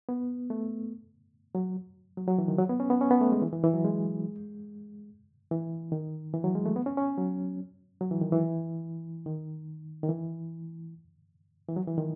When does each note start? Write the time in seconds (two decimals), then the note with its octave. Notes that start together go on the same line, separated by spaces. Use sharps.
0.09 B3
0.50 A3
1.55 F#3
2.17 F#3
2.28 F#3
2.38 E3
2.48 D#3
2.58 F#3
2.69 B3
2.80 C#4
2.90 B3
3.01 C#4
3.11 B3
3.21 A3
3.32 G#3
3.42 E3
3.52 E3
3.63 E3
3.74 F#3
3.85 G#3
5.51 E3
5.92 D#3
6.34 E3
6.44 F#3
6.55 G#3
6.66 A3
6.76 B3
6.86 C#4
6.97 C#4
7.17 F#3
8.01 F#3
8.11 E3
8.21 D#3
8.33 E3
9.26 D#3
10.03 D#3
10.09 E3
11.68 E3
11.76 F#3
11.87 E3
11.98 D#3